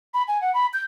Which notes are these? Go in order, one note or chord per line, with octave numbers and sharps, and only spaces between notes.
B5
G#5
F#5
B5
G6